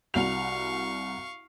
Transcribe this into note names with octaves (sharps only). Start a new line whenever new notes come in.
C2 F#4 F5 C#6 F7